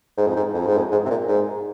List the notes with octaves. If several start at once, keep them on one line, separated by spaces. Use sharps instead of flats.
G#2
F2
G#2
F2
G#2
F2
G#2
C3
A#2
G#2